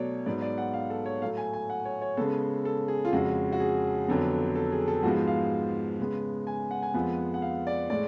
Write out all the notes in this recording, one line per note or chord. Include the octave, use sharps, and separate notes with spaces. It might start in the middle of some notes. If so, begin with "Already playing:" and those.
Already playing: B2 F#3 A3 C#5 D5
G#2 F#3 B3 D5
D5
F#5
F5
A4
C#5
A2 F#3 A3 F5
G#5
G#5
F#5
C#5
C#5
C#3 G#3 B3 A4
A4
G#4
F4
F2 C#3 G#3 F#4
F#4
G#4
F2 D3 F#3 B3
A4
G#4
A4
G#2 F3 G#3 B3 F#4
F5
C#3 G#3 B3
G#5
F#5
G#5
F2 F3 G#3 B3 F#5
F#5
F5
D5
A2 G#3 D5